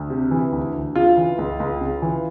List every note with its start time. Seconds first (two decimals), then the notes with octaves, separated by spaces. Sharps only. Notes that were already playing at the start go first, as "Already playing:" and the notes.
Already playing: D2
0.10 C3
0.31 E3
0.52 D2
0.74 D2
0.95 C#3 F4
1.17 E3
1.38 C#2
1.60 C#2
1.81 C#3
2.02 E3